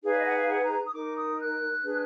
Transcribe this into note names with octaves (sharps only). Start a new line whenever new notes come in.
D#4 G#4 B4 F5
D5
D#5
F#5
F5
F#5
A#5
D#6
D#4 A#4 D6
D#6
F#6
D4 G#4 B4